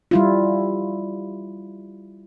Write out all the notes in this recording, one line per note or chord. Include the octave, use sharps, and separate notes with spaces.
G3 E4 F4